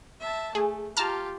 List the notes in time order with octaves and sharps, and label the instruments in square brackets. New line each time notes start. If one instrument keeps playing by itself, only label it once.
[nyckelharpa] E5 A5
[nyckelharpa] A3 [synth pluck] G#4
[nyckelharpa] F4 G4 [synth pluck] A5 A#5 F6